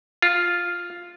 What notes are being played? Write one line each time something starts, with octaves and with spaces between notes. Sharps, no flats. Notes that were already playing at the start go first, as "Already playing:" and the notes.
F4